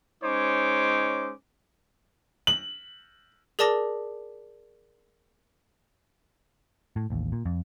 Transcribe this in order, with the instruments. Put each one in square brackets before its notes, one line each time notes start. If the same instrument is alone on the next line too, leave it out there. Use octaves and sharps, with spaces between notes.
[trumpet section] G#3 C#4 D#4 C5 C#5 D6
[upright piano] F#7
[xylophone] G#4 A#4 D5 A5 D6 A#6
[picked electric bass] A2
A1 D#2
A#2
F2